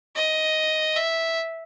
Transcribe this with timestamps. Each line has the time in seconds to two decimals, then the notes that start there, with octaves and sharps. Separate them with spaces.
0.16 D#5
0.96 E5